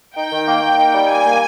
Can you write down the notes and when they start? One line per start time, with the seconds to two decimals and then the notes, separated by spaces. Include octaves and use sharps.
0.15 D#4 G5
0.31 D#3
0.46 A#3
0.62 A#3
0.77 D#4
0.94 G3
1.09 A#3 G#5
1.25 A#3